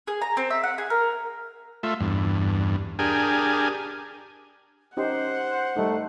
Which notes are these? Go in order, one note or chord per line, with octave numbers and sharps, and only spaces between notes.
G#4
A#5
C4
E5
F#5
G#4
A#4
A3 F4 E5
E2 G2
D4 G4 G#4 A#4 G#5
C#4 D#4 G4 C5 F#5
G3 A3 D#4